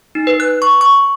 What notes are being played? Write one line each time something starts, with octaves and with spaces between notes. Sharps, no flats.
D#4
B4
F#6
C#6
C#6